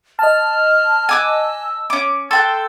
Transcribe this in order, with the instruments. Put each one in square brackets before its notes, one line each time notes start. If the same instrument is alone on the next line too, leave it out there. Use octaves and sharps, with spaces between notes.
[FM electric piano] D#5 A5 [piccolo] F6
[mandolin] G#5 D6 F#6 [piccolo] E6
[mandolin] C#4 D6
[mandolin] A4 G5 F#6 [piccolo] C6 [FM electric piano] E6